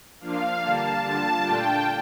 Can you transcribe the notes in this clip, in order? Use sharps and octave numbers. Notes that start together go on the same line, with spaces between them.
F3 A#3 D4 F4 F5
D3 G3 A#3 A5
D3 G3 D4 F4 A5
A#2 A3 D4 F4 G5